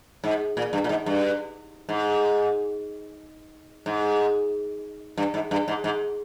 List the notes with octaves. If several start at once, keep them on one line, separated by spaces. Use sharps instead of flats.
G#2
A#2
G2
A#2
G#2
G2
G#2
G#2
G2
G#2
G2
G#2
G#2